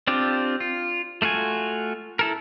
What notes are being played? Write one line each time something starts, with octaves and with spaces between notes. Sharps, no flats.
C4 D4 F4 G4
F4
A3 F4 F#4 G#5
E4 A4 A#4